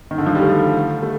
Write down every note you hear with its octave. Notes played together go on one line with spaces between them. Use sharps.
D#3
D3
F3
G3
A3
A3